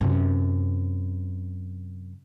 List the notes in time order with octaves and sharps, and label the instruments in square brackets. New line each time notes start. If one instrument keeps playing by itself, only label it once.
[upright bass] F#2 C3